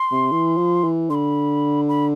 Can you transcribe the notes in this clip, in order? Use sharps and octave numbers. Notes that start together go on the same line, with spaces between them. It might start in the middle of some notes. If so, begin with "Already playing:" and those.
Already playing: C6
C3
E3
F3
E3
D3 C6
B5
B5